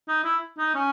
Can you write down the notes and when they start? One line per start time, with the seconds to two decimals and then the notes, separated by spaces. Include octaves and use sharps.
0.08 D#4
0.24 E4
0.58 D#4
0.74 C#4